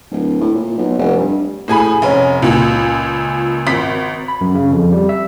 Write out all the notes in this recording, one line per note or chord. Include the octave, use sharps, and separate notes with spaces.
D1
A2
A#2
B1
F1
G2
A2 G#4 G#5 B5
F1 C#4
C#2 A#2
G#1 B6
B5
F#2
C#3
F2
G3
E5